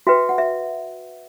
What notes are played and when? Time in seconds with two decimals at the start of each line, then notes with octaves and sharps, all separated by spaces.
0.07 F#4 B4 E5 G5
0.29 F#5
0.38 E5